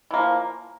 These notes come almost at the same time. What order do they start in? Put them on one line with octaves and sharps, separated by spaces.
E3 A#3 F3